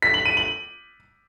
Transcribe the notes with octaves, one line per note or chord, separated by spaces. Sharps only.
B6
F#7
D#7
F#7